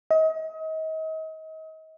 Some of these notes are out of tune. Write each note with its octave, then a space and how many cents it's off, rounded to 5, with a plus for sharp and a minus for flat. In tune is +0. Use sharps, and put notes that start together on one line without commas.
D#5 +35